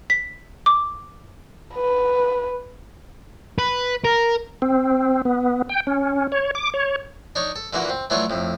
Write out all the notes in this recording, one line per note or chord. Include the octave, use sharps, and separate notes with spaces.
B6
D6
B4
B4
A#4
C4
B3
G5
C#4
C#5
D6
C#5
D4 D#4 C#5
A4
A#2 D3 E3 A#3 F#4
C4
E3 F#3 A3 D4 F4 C#5
F2 A2